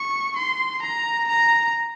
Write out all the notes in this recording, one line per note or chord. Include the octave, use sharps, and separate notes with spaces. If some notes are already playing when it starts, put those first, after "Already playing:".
Already playing: C#6
C6
A#5
A#5